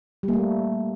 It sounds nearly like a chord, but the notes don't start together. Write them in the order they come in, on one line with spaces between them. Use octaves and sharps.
G3 A#3 A3